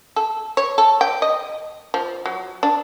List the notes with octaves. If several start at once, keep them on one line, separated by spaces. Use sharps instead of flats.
A4
C#5
A4
G5
D#5
F3
F#3
D4